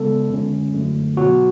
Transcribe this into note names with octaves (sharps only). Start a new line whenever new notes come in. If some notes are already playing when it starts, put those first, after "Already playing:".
Already playing: C#3 G#3 B3 A4
F2 D3 G#3 C#4
F#2 D3 F#3 A3
B2 F#3 B3 F#4